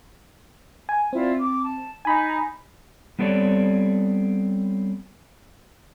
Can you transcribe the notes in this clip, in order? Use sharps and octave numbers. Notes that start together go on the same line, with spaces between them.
G#5
C4 E4 F4 D5
D6
A5
D#4 G#5 A#5 B5
G3 B3 C4 A4 C#5 D5